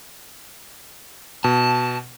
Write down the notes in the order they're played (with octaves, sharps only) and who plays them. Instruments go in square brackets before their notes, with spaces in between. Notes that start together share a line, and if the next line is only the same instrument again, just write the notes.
[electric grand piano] B2 [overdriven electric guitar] A5